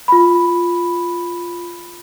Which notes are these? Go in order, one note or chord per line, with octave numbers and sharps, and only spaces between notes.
F4 B5